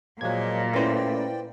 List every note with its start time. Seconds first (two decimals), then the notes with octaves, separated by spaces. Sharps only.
0.21 A#2 F3 F#3 G#3 A#3 G#6
0.74 A3 C#4 E4 B4 C5 D5 G5